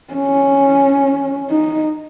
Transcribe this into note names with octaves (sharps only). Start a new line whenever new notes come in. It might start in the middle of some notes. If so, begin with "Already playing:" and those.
C#4
D#4